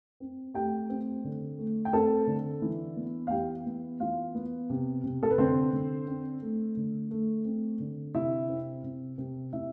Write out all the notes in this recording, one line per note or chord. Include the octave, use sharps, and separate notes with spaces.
C4
A3 G4 G5
C4
D3
A3
G5
C4 A4 A5
D3
E3
B3
F5
E3 G4 G5
B3
E3 F4 F5
B3
C3
C3
A4
B4
D3 C4 C5
D3
C4
A3
D3
A3
C4
D3
C3 E4 E5
C4
C3
C3
C3 E4 E5